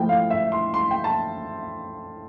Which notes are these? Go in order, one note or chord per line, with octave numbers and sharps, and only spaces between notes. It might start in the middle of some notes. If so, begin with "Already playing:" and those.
Already playing: F3 A3 E4 G5
F5
E5
C6
C6
G5
A5